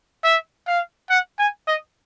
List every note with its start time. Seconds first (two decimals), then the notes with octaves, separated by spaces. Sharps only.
0.24 E5
0.67 F5
1.10 F#5
1.38 G#5
1.67 D#5